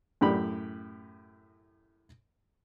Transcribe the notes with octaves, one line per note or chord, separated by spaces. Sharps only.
F#2 A2 G4 B5